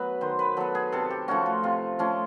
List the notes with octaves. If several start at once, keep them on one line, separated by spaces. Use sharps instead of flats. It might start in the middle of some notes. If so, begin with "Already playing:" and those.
Already playing: F#3 B3 B4
D#3 C5
B4
F#3 B3 A4
G#4
C3 A4
G4
F3 A3 C#4 F#4
F4
C3 F4
F3 A3 C#4